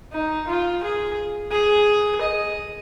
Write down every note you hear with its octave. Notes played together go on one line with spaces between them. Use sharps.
D#4
F4
G#4
G#4
D#5